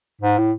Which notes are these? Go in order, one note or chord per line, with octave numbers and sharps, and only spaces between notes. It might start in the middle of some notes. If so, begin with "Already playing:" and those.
G#2
A2